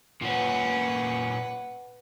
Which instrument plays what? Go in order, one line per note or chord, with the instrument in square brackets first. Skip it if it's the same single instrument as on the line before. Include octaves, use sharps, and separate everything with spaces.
[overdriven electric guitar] A#2 C#4 [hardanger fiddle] B4 F#5